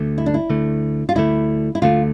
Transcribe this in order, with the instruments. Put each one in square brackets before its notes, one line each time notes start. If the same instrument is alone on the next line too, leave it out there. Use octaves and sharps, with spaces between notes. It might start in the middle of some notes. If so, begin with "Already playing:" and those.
Already playing: [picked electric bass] D2 D3 A3
[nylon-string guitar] E4
D4
E4
[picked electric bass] D2 D3 A3
[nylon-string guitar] F4
[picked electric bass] D2 D3 A3 [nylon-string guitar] E4
[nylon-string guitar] E4
[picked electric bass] D2 D3 A3 [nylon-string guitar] F4